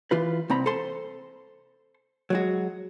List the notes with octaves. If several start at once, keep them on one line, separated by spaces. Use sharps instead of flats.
E3 F4 B4
C2 C4 A#5 B5
A4 C5 A5 C6
F#3 G#3 F#4